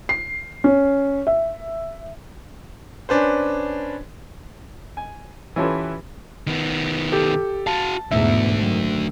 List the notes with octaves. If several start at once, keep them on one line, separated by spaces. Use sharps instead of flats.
C7
C#4
E5
C#4 D4 B4 C5
G#5
E3 C#4 F4 G4 A4 B4
D#3 B3
G4 A4
F#4 F5 A5
E2 G#2 B2 D3 A3 E5
F#2 D#3